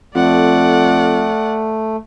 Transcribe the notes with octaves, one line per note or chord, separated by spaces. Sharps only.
F2 A3 D5 F#5